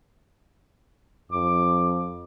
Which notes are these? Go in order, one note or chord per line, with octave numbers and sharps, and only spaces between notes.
F2 D6